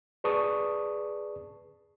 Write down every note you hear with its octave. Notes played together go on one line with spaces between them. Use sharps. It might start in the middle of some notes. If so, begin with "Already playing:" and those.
G#4 B4 D5 A5 C#6 D#6